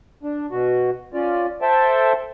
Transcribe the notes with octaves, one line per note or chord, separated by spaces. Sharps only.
D4
B2 F#4
C#4 F4 D5
A4 C5 E5 G5 A5